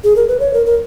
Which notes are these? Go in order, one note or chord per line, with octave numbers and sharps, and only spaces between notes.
G#4
A#4
B4
C#5
A#4
A#4